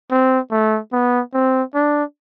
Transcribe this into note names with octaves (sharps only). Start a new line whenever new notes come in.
C4
A3
B3
C4
D4